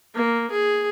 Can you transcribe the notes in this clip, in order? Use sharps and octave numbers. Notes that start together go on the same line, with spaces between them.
A#3
G#4